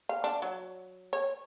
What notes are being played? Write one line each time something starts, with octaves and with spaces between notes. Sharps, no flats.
F5
D4
F#3
C#5